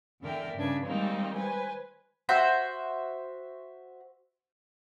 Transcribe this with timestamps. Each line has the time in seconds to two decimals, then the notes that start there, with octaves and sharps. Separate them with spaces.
0.21 E2 D3 A#4 D5 E5 G5
0.56 G2 C#3 D4 B4 G#6
0.85 D#3 G3 G#3 A#3 C4 D#4
1.36 B4 C5 G#5
2.29 F#4 C5 E5